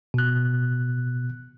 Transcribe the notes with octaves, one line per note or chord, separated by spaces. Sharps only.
B2 F#6